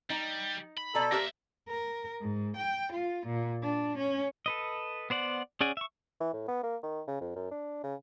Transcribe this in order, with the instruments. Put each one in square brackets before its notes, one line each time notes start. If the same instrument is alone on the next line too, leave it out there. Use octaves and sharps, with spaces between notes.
[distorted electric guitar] G3 [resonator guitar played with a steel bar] D#4
[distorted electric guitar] B5
[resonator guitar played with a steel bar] B2 D5 A#5 [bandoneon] A4
[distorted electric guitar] A#3 E5 [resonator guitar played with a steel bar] G4 A#4 C5
[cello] A#4
G#2
G5
F4
A#2
D4
C#4
[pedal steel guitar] A4 B4 D#5
B3 C5 D5 F#5
C#4 G#4 D5 F#5 G#5
E5 C#6
[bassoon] E3
A2
B3
A#3
D#3
C#3
F2
F#2
D4
C#3